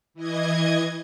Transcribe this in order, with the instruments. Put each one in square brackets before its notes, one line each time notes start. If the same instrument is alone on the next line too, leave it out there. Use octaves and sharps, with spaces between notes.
[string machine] E3 D#5 G#6